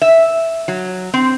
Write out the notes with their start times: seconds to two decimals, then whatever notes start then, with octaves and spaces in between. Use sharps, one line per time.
0.02 E5
0.68 F#3
1.14 C4